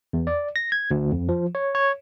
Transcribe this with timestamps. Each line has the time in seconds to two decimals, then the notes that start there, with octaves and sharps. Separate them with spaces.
0.13 E2
0.27 D5
0.56 A#6
0.72 G#6
0.91 D2
1.12 F2
1.29 F3
1.55 C#5
1.75 C#5